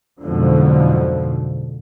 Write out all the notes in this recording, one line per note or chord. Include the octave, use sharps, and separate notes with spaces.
B1 F2 G#2 B2 D3 F3